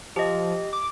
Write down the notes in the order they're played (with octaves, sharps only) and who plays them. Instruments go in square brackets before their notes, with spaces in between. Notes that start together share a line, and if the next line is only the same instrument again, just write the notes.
[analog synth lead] F3 [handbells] G4 D#5
[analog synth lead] D6